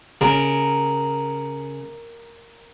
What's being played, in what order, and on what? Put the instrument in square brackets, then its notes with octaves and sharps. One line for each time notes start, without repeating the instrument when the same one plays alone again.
[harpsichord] C#3 [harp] A#4